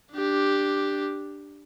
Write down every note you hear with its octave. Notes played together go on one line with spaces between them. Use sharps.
D4 G4